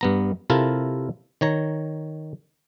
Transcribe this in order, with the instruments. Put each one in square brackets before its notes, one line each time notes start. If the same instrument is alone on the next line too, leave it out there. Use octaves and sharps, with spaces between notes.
[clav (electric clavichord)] G2 B3 A#5
C3 E4 F4 A4 A#4
D#3 C#5 A#5